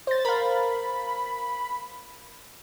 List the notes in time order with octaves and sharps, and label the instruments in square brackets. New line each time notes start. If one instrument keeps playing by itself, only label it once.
[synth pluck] C5 A6
[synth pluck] A#4 F5 [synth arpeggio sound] B5